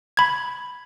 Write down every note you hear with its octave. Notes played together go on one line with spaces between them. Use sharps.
B5 G#6